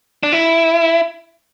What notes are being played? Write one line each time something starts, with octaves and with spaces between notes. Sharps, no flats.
D4
E4